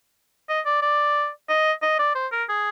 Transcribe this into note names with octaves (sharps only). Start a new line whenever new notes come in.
D#5
D5
D5
D#5
D#5
D5
C5
A#4
G#4